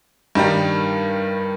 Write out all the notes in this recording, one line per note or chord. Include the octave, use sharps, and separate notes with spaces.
G2 D#3 G3